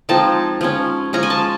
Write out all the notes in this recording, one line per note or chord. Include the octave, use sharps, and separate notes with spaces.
F3 G#3 C4 D#4 A5
F3 G#3 C#4
F3 G#3 C#4 A#5
G#5
A5